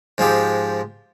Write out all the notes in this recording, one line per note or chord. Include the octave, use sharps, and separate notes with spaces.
G#2 F3 G#3 G4